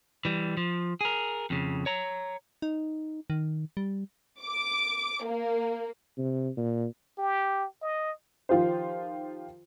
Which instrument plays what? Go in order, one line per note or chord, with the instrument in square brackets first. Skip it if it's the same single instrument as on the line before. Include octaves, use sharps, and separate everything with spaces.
[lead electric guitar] E3 G3
F3
G#4 A#4
F2 C#3
C#5 A#5
[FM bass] D#4
D#3
G3
[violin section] D6
A#3
[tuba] C3
A#2
[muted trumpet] G4
D#5
[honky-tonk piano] D#3 F3 F4 G4 C5